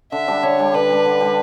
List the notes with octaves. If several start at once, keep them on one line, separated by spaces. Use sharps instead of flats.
D3 E5
G3 D4
D3 C#5
G3 D4
D3 B4
G3 D4
D3
G3 D4